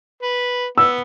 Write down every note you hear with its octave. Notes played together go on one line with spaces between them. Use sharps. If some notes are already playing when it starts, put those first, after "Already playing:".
B4
B3 E6